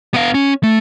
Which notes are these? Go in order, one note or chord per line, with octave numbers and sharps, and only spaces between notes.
B3 F5
C#4
A3